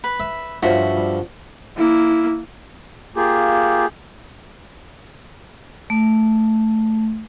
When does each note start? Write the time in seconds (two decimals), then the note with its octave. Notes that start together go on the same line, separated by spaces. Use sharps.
0.04 B4
0.20 E5
0.63 G2 F3 F4 F#4 C5 C#5 E5
0.97 G3
1.77 A#3 E4
3.16 A#3 F4 G4 G#4
5.90 A3